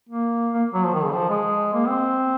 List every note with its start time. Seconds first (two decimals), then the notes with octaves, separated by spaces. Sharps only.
0.09 A#3
0.54 A#3
0.74 F#3
0.84 F3
0.93 D#3
1.04 C#3
1.14 F3
1.29 G#3
1.73 A#3
1.88 C4